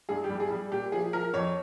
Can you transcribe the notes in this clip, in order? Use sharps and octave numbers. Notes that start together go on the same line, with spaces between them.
G2 G#4
G4
G3
G#4
G3
A#2 G4
F3 G#4
F3 A#4
F2 C#5